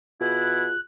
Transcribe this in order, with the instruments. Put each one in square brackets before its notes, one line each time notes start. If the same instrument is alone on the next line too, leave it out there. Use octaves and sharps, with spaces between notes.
[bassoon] B2 [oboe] E4 [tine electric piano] F4 G#4 [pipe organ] F#6